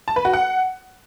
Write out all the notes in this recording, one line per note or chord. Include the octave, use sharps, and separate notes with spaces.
A5
B4
F#4
F#5